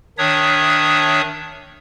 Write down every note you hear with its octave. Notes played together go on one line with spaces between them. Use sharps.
D#3 D4 C#5 E5 D#6